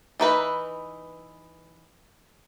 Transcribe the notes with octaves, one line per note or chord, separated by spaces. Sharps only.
E3 D#4 B4 E5